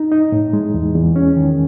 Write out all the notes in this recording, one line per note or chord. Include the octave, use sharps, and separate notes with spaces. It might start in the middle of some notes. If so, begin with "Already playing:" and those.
Already playing: D#4
D#4
A2
G#3
E2
E2
C#4
D#3